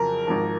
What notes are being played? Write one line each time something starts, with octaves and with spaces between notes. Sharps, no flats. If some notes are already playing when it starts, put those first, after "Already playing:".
Already playing: F2 C#3 F#3 A#4
G#1 G#2 F3